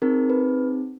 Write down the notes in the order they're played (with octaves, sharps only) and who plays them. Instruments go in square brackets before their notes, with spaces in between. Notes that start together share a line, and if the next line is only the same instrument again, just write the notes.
[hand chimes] C4 D#4 G#4 A#4
B4